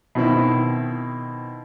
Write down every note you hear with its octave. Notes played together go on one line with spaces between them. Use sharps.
B2 D#3 C4 E4